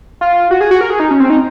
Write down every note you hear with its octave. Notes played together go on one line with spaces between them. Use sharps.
F4
F#4
G#4
F#4
A#4
G#4
D#4
C#4
C4
D#4